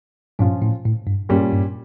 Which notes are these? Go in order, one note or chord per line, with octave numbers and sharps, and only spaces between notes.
G2 A#2 F3 C#4 F4
A2
A2
G2
G2 A#2 G3 C#4
G2